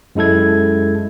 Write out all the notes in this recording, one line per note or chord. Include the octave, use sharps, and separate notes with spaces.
F#2 G#3 E4 A4 G#6